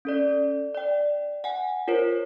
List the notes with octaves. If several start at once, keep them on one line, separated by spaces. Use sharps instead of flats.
C#4 A4 D5
D5 G5
F#5 G#5
F4 A#4 C5 C#5